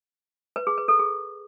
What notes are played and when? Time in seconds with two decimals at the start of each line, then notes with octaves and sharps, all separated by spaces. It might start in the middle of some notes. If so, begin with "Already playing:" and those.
0.56 B4
0.67 G#4
0.78 B4
0.88 A4
0.99 G#4